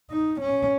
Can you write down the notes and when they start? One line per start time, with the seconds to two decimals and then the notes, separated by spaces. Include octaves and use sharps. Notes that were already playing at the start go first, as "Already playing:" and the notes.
0.11 D#4
0.41 C#4